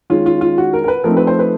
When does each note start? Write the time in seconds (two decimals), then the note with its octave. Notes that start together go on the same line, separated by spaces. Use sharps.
0.10 D#3 G#3 C#4 F4
0.26 F4
0.41 F4
0.58 F#4
0.73 A#4
0.84 A#4
0.88 B4
1.04 F3 A3 C4 D#4 A#4
1.17 B4
1.27 C5
1.39 B4